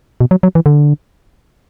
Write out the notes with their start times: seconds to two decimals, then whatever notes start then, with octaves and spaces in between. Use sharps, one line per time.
0.20 B2
0.31 F#3
0.43 F#3
0.55 E3
0.66 D3